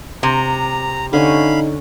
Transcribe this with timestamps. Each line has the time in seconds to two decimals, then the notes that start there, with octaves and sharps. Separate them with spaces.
0.23 C3 A#5
1.13 D3 C#4 D#4 F5 B5